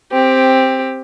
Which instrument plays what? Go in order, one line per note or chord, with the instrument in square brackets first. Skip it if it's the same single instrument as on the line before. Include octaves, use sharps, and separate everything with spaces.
[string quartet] C4 G4